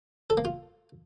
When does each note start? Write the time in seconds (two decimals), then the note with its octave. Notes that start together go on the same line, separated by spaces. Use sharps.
0.30 A4
0.37 A#3
0.45 F4